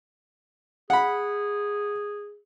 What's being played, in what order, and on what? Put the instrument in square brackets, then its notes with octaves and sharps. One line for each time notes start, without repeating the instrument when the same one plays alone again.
[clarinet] G#4 [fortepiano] F#5 B5